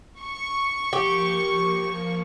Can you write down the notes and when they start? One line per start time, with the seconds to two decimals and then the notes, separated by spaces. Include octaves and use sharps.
0.21 C#6
0.93 F3 A#3 G4